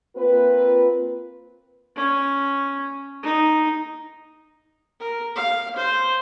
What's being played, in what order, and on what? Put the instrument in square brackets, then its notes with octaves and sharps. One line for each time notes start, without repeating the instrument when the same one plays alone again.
[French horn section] A#3 C4 F4 B4
[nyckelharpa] C#4
D#4
A#4
F5
C5